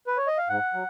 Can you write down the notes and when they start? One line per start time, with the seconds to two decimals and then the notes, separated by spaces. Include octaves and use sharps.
0.07 B4
0.17 C#5
0.27 D#5
0.38 F5
0.49 G#2 F#5
0.74 F#3